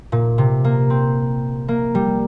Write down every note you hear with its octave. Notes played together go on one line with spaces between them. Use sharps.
A#2
C3
A#3
C4
A#3
G3